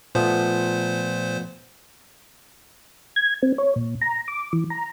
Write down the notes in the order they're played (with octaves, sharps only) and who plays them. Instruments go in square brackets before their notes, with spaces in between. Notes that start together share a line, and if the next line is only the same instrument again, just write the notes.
[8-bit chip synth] A#2 C5 [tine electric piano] F3 A3 B3
[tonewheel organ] G#6
C4
C#5
A#2
A#5
D6
E3
A#5